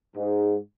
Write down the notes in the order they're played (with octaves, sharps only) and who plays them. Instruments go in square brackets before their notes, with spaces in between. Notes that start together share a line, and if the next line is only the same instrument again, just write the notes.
[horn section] G#2